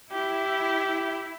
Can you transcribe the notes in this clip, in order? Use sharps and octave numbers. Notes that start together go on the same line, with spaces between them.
E4 G4